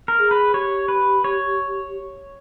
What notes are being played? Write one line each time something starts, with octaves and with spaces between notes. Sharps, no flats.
A#4
G#4
B4
G4 C#5
B4
C#5